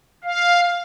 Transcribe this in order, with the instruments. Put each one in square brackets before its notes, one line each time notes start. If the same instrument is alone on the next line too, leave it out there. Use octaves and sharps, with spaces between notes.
[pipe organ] F5